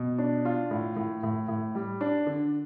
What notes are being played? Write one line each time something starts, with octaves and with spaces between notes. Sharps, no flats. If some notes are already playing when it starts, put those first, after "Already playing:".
Already playing: B2
D4
F4
A2
A2
A2
A2
G3
D4
D3